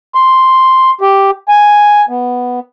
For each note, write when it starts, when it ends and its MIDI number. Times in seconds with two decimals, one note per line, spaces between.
0.15 0.90 84
1.01 1.31 67
1.48 2.05 80
2.09 2.60 59